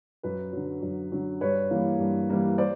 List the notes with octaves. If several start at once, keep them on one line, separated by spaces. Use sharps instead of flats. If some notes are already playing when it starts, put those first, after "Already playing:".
F#2 B4
D3 F#3
F#2
D3 F#3
G2 B4 C#5
E3 G3 A#3
G2
E3 G3 A#3
C5 D5